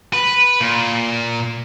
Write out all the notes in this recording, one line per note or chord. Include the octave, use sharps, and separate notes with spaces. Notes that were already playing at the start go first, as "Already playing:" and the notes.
B4
A#2